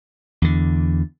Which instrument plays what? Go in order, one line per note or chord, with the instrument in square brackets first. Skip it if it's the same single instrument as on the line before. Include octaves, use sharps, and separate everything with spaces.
[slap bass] E2 D3